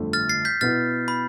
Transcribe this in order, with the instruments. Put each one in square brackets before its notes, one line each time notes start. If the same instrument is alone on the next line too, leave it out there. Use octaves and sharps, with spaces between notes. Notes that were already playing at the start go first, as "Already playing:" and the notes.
Already playing: [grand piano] G1 F2 D3 A3 D4
[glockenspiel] F6 A6
A6 C7
G6 B6
[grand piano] B2 B3 E4 [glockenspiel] F6 A6
[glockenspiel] B5